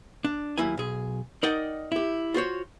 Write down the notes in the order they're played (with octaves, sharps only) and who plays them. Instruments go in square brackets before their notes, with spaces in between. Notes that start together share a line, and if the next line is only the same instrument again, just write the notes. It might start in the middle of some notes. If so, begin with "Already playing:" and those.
[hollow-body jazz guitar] D4
D#2 F#3 A#3 E4 G#5
B1 G#4
D#4 A#4 D5 D#5 F#5 G5
E4 G4
F4 F#4 C5 C#5